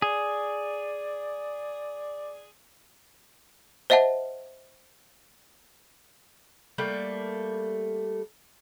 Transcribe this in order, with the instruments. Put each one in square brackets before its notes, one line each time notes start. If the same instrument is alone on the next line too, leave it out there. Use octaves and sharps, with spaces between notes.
[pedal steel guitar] G#4 [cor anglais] D5
[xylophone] C5 D#5 E5 F#5 A5
[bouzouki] G3 A3 A#3